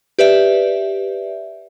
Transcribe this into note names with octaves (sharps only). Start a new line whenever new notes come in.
G4 B4 D5 E5